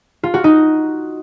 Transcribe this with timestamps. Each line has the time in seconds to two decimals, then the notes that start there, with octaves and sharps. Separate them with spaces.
0.23 F4
0.34 F#4
0.44 D#4